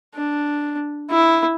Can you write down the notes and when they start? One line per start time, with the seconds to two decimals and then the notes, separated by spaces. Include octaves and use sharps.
0.15 D4
1.10 E4